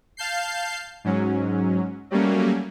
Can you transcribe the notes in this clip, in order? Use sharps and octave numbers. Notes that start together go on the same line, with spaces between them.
F5 A5 G6 C7
G#2 F#3 C#4
F#3 G3 A3 A#3 C#4